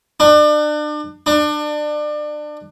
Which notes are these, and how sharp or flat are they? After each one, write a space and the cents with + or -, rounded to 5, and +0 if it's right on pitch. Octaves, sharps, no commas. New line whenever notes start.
D4 +35
D4 +30